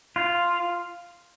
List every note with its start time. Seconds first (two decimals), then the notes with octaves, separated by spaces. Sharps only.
0.16 F4